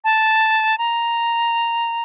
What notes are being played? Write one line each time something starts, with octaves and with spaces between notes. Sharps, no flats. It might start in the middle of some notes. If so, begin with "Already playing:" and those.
A5
A#5